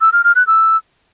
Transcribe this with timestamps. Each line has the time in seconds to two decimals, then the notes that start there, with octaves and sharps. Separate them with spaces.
0.01 E6
0.13 F6
0.24 F6
0.36 F#6
0.47 E6